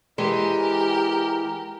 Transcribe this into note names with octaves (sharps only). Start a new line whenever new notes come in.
E3 G#3 G4 A#4